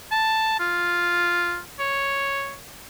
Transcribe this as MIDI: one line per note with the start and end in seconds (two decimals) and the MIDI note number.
0.12 0.59 81
0.60 1.59 65
1.79 2.55 73